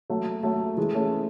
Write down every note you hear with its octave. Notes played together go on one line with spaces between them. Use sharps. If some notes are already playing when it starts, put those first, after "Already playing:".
F#3 A3
F#3 A3
E3 G#3
A3 C#4